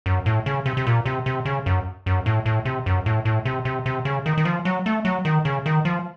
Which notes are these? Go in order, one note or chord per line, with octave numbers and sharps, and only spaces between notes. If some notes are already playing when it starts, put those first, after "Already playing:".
F#2
A2
C#3
C3
C3
A#2
C3
C3
C#3
F#2
F#2
A2
A2
C3
F#2
A2
A2
C3
C3
C3
C#3
D#3
D#3
F3
F#3
A3
F#3
D#3
C#3
D#3
F3